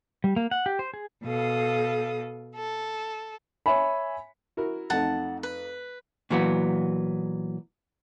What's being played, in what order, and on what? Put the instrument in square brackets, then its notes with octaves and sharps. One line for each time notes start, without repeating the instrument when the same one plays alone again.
[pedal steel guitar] G3
A#3
F#5
G4
C5
G#4
[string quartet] B2 A4 F5 D#6
A4
[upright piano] C#5 E5 G#5 B5
[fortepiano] E4 F#4 A#4
[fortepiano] F2 A3 D#4 [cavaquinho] F#5 A5
[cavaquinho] B4
[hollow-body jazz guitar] A#2 E3 F#3 B3